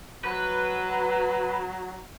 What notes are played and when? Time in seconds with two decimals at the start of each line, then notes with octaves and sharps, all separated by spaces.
0.24 F#3 B4